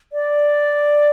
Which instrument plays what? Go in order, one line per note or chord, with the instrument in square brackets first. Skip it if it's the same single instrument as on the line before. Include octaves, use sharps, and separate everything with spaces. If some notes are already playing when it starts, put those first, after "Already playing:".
[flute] D5